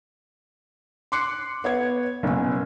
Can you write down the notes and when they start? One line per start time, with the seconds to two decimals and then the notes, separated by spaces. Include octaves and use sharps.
1.12 C6 D6 F#6 C7 C#7
1.64 B3 C#5 G#6
2.23 F#1 B2 G#5